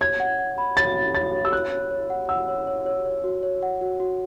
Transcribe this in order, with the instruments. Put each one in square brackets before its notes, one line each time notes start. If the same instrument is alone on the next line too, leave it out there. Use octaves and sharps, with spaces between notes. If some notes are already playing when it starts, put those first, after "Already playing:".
[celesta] C#5 [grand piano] G#6
[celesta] F#5
F#5
B5
[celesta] C#5 [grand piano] A6
[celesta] C#5
[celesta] C#5 [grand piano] A6
[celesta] C#5
[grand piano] E6
[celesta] C#5 [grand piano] F#6
[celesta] C#5
C#5
F#5
[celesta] F#5 [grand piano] E6
[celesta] C#5
C#5
C#5
C#5
F#4
C#5
F#5
F#4
F#4